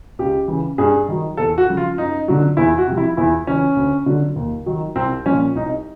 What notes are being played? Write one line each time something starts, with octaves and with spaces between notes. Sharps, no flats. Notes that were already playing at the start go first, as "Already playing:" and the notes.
C#2 G4
C#3 E3
G2 G#4
D#3 F#3
E2 A4
F#4
C#3 F3
F4
F#2 D#4
D3 F#3
E2 E4
F#4
C3 F3
E4
E2 E4
C#3 E3 C#4
D2
D3 F#3
D#2
D#3 F#3
C2 C4
A#2 F3 C#4
C2 D#4